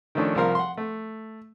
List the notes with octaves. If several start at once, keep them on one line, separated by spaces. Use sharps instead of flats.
D#3 F3 A3 C#4 D4
C2 F3 C4 A#4 F5 F6
F#5 C6
A3